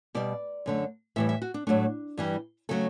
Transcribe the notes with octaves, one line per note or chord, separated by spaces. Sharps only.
B2 G3 D5
F#2 D3 A3
A2 E3 G3 E5
E5
F#4
D4
A2 F#3 A3 D4
G2 E3 G3
C#3 F#3 A3 A4